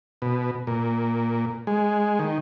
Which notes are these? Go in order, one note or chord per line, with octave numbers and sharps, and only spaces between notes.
B2
A#2
G#3
D#3